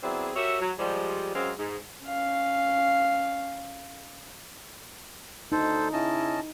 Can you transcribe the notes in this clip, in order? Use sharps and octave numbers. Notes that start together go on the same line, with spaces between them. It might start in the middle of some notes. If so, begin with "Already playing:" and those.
F#3 B3 C4 D4 E4 G#4
F#4 G4 A#4 C#5 E5
F#3
F3 G3 G#3
F#2 F#3 G#3 C4 F#4 F5
G#2
C#4 F5
D2 D3 D#4 A4 C5
C#3 C#4 E4 D#5 A5